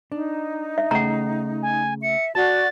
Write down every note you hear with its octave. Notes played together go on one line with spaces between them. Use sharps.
D4 D#4
E5
C#3 A3 F#5 G5 A#5
G#5
E5 C#7
F#4 D5 A5 A6